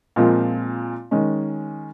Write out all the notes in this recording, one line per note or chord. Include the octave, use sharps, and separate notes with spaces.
A#2 F3 G#3 C4 F4
D#3 G#3 C#4